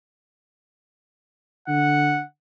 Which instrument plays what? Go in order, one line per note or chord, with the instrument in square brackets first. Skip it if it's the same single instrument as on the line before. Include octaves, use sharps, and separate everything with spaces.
[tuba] D3 [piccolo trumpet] F#5